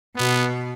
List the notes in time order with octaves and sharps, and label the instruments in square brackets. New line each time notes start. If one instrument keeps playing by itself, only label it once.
[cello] B2 [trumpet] B3